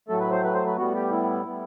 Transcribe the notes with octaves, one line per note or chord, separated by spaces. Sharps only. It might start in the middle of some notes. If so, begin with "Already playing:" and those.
A2 F#3 A3 A4
B4
C5
B4
C5
B4
A2 G3 B3 F#4
G4
E4
A2 G3 B3